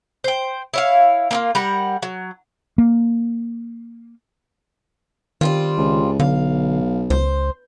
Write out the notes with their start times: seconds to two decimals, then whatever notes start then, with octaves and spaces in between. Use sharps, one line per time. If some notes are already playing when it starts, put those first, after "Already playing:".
0.24 C5 G5
0.74 E4 C#5 F5
1.31 A#3 E4 F4
1.55 G3 A#4 F#5
2.02 F#3
2.78 A#3
5.41 D#3 G3 C4 F4
5.78 C#2
6.20 B1 D3 F5
7.10 C#2 C5